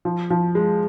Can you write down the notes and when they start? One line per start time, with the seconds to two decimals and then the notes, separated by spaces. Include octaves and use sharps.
0.05 F3
0.30 F3
0.55 G#3